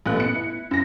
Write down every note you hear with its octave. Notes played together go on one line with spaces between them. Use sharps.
A1 A#2 A3 B4 F#6
B3 C#7
E4
F#2 A#6